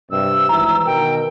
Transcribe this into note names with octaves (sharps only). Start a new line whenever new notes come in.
G2 C3 E6
G#1 E3 A#5
B2 D#3 A#4 G5